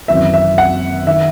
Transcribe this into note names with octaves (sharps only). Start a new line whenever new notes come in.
G#1 F#2 E3 E5
E5
F#5
D#3 E5